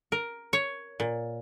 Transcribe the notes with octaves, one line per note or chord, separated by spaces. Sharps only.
A#4
C#5
A#2